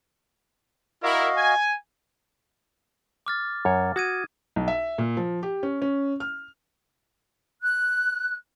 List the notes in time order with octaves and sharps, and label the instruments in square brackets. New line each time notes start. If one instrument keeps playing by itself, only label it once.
[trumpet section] E4 A#4 [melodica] F#4 D#5 F5
[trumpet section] G#5
[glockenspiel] D6 F6 A6
[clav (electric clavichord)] F#2 C#5
[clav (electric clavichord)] F#4 [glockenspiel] D#6 G#6 D#7
[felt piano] B1
E5
A#2
F3
G4
C#4
C#4
F6
[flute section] F#6